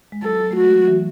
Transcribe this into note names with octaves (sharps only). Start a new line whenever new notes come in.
G#3
F#3 A4
A3
F#4
G#3
F#3
E3